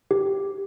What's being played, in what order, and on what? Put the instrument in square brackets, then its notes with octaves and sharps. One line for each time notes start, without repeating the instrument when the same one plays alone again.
[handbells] G4